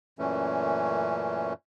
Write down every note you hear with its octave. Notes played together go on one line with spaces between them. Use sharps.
F#2 A#2 E3 A3 C#4